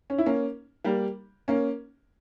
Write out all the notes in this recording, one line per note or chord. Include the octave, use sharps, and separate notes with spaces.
C#4
E4
A#3 C#4
G3 A#3
A#3 C#4